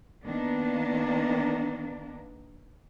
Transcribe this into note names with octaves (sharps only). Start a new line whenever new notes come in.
D#3 A#3 B3 D4